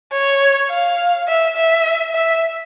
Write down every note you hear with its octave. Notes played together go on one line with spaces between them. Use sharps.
C#5
F5
E5
E5
E5